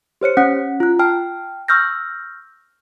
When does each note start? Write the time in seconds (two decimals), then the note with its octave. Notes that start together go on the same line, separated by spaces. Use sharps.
0.21 G4 C5 C#5 C#7
0.37 C#4 F#5 F#6
0.80 F4 F#6
0.99 G5 A5 F6
1.68 C#6 E6 F6 G6 A#6